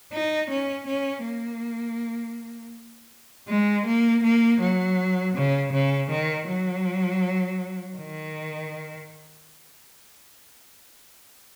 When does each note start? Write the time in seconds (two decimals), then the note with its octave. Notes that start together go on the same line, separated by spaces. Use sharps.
0.12 D#4
0.50 C#4
0.87 C#4
1.24 A#3
3.48 G#3
3.86 A#3
4.23 A#3
4.61 F#3
5.35 C#3
5.73 C#3
6.10 D#3
6.48 F#3
7.97 D#3